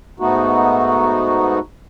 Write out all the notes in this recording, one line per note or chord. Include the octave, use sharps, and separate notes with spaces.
G#2 A3 B3 D#4 F#4